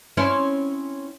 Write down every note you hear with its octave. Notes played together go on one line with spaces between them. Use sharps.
C4 C#4 E4